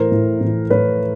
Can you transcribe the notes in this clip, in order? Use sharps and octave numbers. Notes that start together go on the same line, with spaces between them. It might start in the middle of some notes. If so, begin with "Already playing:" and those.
Already playing: A2 E3 A#4 C5
A2 E3
A2 E3
A2 E3 B4 C#5